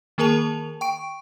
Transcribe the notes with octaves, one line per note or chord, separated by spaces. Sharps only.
D#3 A#3 G#4 A#4 A5 F7
G5 C#6 D7